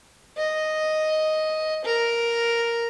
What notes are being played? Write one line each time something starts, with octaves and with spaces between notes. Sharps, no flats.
D#5
A#4